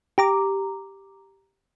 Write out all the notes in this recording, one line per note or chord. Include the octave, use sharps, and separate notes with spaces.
G4 A#5 D6